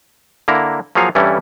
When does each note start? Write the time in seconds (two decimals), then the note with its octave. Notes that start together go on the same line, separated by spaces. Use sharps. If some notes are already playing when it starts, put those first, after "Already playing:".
0.48 D3 A#3 E4 A#5
0.95 F3 F#3 A#3 G#4 C#5 F5
1.15 G2 E3 G3 C#4 E4 A4